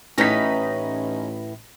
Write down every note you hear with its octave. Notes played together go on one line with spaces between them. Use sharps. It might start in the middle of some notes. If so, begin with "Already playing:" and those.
A1 A2 C#4 D#4 B4 E5 A#6 B6